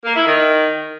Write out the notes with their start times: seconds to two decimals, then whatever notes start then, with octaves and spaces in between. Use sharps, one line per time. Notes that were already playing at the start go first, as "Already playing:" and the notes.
0.05 A#3
0.16 E4
0.27 D#3